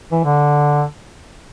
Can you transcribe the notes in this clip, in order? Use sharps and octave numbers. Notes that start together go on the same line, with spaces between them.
E3
D3